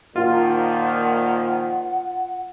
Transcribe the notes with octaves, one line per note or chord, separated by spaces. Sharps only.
A#2 D#3 F3 F4 F#5